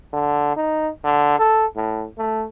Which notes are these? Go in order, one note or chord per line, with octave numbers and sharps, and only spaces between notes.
D3
D#4
D3
A4
A2
A3